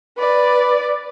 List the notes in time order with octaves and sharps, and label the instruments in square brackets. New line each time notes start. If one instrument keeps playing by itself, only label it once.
[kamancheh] B4 D5